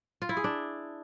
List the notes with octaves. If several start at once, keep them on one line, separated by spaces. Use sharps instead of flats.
F4
E4
G#4
D4